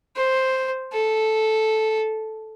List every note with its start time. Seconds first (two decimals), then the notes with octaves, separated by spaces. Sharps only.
0.16 C5
0.93 A4